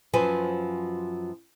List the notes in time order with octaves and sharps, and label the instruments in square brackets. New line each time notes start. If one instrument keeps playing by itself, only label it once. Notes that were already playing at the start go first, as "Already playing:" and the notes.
[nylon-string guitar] F#2 F3 F#3 B4 C5 G#5